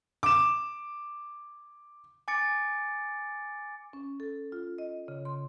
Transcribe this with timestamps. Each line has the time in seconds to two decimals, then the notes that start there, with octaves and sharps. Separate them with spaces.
0.23 D6 E7
2.28 G#5 D6 A6 C#7 D7
3.93 C#4
4.20 A4
4.52 F4
4.78 D#5
5.08 C#3
5.25 C6